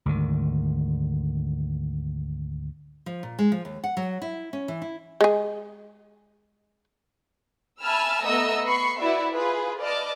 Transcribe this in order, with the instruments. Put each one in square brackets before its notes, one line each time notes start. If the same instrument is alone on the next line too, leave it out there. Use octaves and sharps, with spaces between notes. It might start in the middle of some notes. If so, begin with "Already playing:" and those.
[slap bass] D2 G#2 D#3
[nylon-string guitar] F3
A#2
G#3
F3
D#2
F#5
F#3
E4
C#4
E3
E4
[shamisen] G#3 G#4
[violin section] E5 G#5 A5 B5 E6 F6
A3 B3 D#5 E5 A#5 E6
B3 B5 C#6 C7
E4 F#4 B4 D5 E5
F4 G#4 B4
B4 D5 D#5 A5 D6 F6